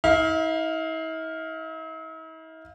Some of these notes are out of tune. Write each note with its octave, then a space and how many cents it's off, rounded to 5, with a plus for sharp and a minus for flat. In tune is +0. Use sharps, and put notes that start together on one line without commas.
E4 -45 F5 +0